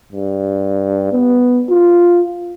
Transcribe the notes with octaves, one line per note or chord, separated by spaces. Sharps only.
G2
B3
F4